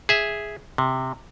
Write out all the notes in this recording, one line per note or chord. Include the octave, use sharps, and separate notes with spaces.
G#4 E5
C3